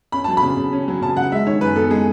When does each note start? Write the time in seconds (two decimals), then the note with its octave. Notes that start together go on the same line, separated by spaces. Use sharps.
0.12 C#4 B5
0.24 F#3 A5
0.37 B5
0.43 C#3
0.57 C#3
0.73 C#4
0.88 F#3
1.02 C#3 A5
1.17 C#3 F#5
1.32 G#3 E5
1.47 D#3 C#5
1.61 F#2 B4
1.76 B3 A4
1.91 G#3 G#4